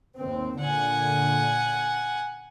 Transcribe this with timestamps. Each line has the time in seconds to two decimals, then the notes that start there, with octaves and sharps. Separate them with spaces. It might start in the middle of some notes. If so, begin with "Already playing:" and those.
0.16 D#2 C4
0.61 A#2 D3 F#5 G#5